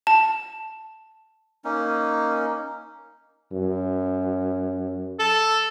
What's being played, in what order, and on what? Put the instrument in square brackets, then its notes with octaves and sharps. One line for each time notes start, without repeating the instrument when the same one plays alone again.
[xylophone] A5
[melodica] A#3 C#4 D#4
[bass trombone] F#2
[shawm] A4